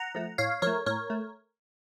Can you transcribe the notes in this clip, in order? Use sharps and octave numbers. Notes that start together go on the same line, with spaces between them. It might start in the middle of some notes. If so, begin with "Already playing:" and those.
Already playing: F#5 A#5
F3 A3
A2 C#5 F5
F3 A3 A#4 C#5
A2 A#4 C#5
A3